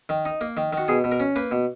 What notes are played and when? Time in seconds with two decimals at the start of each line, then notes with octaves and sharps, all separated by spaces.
0.09 D#3
0.25 D#4
0.41 A#3
0.57 D#3
0.73 D#3 F#4
0.88 B2 G#4
1.04 B2
1.12 A#4
1.20 C#4
1.36 A#3 B4
1.51 B2